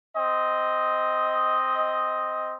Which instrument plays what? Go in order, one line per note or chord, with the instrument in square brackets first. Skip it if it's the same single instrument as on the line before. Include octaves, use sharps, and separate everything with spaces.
[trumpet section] C4 D#5